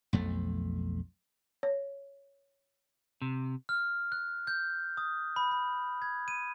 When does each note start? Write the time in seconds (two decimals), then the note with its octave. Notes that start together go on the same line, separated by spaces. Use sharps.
0.13 B1 F2 A3
1.63 C#5
3.22 C3
3.69 F6
4.12 F#6
4.47 G6
4.97 D#6
5.36 B5
5.51 B5
6.02 G#6
6.28 D#7